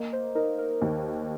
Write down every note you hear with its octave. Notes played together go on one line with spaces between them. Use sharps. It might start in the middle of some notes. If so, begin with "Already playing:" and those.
Already playing: A#3 D#5
C5
D#4 A#4
A#4
D#2